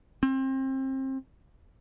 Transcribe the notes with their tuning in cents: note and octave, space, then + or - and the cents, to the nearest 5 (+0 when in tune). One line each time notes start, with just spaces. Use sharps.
C4 +30